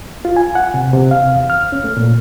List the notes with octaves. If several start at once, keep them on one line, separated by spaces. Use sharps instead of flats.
F4
G#5
F#5
C3
C3
F5
E2
F6
C#4
A3
A#2